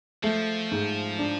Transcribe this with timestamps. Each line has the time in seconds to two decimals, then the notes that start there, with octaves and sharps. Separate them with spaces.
0.23 F3 A3
0.71 G#2
1.19 D4